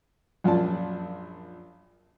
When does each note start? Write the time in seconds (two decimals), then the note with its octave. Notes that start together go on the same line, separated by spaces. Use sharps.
0.44 A#1 F#2 F4 D5 A5